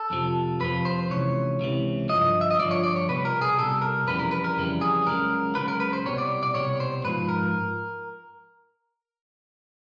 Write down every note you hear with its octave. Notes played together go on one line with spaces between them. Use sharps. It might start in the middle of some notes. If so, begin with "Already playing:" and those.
Already playing: A4
F2 C3 F3
F2 C3 F3 B4
C5
C#2 C3 E3 C#5
C#2 C3 E3
G2 D3 F3 D#5
E5
D#5
G2 D3 F3 D5
C#5
D5
C#5
C2 B2 G3 B4
A#4
G#4
C2 B2 G3 A4
A#4
F2 C#3 E3 G3 B4
A#4
B4
A#4
F2 C#3 E3 G3
G#4
C#2 C#3 F#3 A#4
C#2 C#3 F#3 B4
A#4
B4
C5
C2 B2 G3 C#5
D5
D5
C2 B2 G3 C#5
C5
G#2 F3 B4
A#4